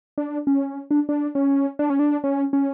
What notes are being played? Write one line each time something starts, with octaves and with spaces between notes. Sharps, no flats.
D4
C#4
D4
D4
C#4
D4
C#4
D4
C#4
C#4